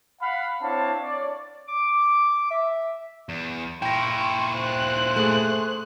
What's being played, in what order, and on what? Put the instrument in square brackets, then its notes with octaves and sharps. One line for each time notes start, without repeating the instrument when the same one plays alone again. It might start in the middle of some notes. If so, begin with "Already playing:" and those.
[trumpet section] F5 F#5 B5
C4 D4 E4 C#5 F5 A5
D4 C#5 D5
[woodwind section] D6
E5
[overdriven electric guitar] E2
[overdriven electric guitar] A#2 E4 [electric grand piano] G5 A#6 [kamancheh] C6 C#6
[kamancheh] C5 F#6
[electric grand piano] A3 G#4